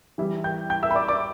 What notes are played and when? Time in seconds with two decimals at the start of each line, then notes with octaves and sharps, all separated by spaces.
0.18 E3 G3 E4
0.44 G5 G6
0.70 G5 G6
0.83 E5 E6
0.91 B5
0.95 D5 D6
1.08 D5 D6